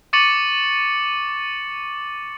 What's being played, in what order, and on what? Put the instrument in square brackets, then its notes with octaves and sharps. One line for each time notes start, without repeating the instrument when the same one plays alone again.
[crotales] C#6 D6 A6 C#7 D#7 F#7